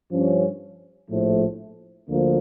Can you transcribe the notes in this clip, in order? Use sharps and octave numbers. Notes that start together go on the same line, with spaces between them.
G2 F3 C#4
A#1 A2 F3 A3
D2 D3 F3 A#3